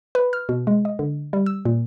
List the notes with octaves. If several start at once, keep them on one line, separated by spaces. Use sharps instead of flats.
B4
F6
B2
G#3
D#5
D3
G3
E6
A#2